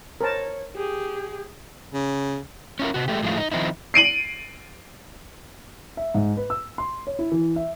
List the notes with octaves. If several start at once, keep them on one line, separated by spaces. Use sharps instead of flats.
A#4 C5 C#5 A5
G4 G#4
C#3
C#4 E4 F4 A#4
C3 F#4
G#3 A3 G4
A2 F3 G#3 A3 F4
D#4
D#3 F3 C4 D#4 E4
C7 D7 D#7 F#7
E5
G#2
B4
E6
C6
C#5
E4
E3
E5